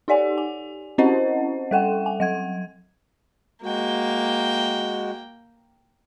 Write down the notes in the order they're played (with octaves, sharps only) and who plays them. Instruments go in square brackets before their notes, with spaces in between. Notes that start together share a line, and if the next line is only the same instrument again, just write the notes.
[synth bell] D#4 G4 D5 F#5 G#5
G#5
C4 C#4 E4 C5 D#5 F#5
G3 A4 F#5 G5
G#5
F#3 F#5 G#6
[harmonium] G#3 F#4 [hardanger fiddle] A#3 G5